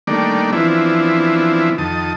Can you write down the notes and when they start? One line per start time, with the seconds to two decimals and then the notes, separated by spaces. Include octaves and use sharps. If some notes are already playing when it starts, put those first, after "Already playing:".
0.07 D#3 G3 A3 A#3 D4 D5
0.53 E3 F3 B3 C4 D4 E4
1.78 F2 D#3 A5 D#6